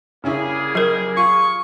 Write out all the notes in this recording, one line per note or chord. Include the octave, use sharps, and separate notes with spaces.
C#3 G3 A#3 C#4 E4 G#4
F#3 A#4
F4 C#6